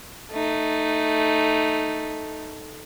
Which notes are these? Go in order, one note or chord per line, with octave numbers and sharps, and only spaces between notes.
A3 D#4